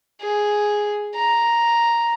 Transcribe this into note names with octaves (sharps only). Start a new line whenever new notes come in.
G#4
A#5